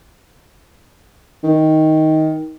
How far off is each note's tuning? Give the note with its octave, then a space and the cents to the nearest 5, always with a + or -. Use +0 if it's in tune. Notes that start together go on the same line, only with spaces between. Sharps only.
D#3 +10